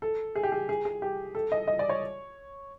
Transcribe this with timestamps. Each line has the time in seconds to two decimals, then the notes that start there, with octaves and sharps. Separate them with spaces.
0.02 A4
0.35 G#4
0.43 G4
0.52 G#4
0.69 G#4
0.85 G#4
1.02 G4
1.35 A4
1.52 D#5
1.67 D#5
1.79 D5
1.89 C#5